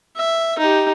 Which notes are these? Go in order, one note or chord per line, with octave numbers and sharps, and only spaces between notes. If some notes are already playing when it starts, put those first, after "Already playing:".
E5
D#4 G4